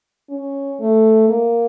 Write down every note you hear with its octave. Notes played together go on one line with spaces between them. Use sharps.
C#4
A3
A#3